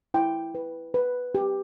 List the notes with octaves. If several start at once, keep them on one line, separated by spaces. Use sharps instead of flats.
E4 G5
B4
B4
G4